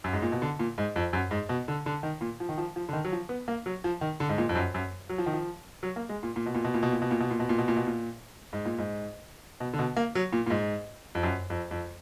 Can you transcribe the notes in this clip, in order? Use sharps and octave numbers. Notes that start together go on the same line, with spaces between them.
F#2
G#2
A#2
B2
D3
A#2
G#2
F2
F#2
G#2
B2
D3
D3
D#3
A#2
F3
D#3
F3
F3
D3
D#3
F#3
F3
B3
A#3
F#3
F3
D#3
D3
G#2
A#2
F2
F#2
F#2
F#3
F3
D#3
F3
F#3
A#3
G#3
A#2
A#2
B2
A#2
B2
A#2
B2
A#2
B2
A#2
B2
A#2
B2
A#2
B2
A#2
B2
A#2
G#2
A#2
G#2
B2
D3
B2
A#3
F#3
A#2
A#2
G#2
F2
F#2
F2
F2